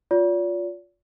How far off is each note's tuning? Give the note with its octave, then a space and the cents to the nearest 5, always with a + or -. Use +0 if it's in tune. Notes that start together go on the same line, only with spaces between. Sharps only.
F4 +15 D5 -40